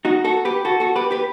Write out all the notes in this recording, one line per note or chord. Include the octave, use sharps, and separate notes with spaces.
D#4 F#4
F#4 A4
G4 B4
F#4 A4
F#4 A4
G4 B4
G4 B4